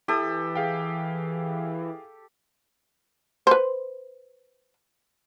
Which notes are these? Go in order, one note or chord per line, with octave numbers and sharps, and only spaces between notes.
E3 G4 A4 D#6
G#4 F5 G5
B4 C5